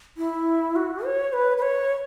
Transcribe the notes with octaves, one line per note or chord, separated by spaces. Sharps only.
E4
F#4
C#5
B4
B4
C#5